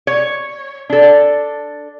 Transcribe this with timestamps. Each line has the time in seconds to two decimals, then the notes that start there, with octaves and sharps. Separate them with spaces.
0.07 C#5
0.90 D4 A4